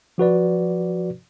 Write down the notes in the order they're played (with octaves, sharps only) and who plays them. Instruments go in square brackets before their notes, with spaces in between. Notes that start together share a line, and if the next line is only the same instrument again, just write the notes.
[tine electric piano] F3 F#4 B4 D5